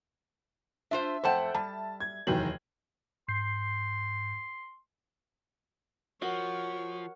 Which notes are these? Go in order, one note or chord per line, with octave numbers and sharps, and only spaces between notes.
D4 F4 C5 E5
F2 A3 C5 F#5 G5 A5
G3 A5
G#6
F1 D#2 D#3 E3 F#3 F#7
G#2 C6 G6 C7
F3 F#4 A#4 C#5 F#5